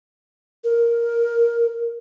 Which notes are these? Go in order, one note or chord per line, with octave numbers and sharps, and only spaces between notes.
A#4